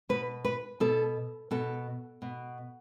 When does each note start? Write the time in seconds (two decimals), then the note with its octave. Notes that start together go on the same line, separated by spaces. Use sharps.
0.09 B2 B4
0.44 B4
0.80 B2 A4
1.51 B2 A4
2.22 B2